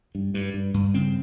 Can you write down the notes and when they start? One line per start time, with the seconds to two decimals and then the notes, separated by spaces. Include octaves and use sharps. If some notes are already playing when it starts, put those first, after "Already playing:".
0.15 G2
0.34 G2
0.54 G2
0.74 G2
0.94 C#3 C4